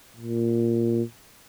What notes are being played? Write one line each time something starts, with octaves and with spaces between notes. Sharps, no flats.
A#2